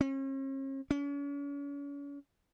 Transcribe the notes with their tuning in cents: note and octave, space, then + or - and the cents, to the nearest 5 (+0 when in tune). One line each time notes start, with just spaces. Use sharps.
C#4 -45
C#4 +40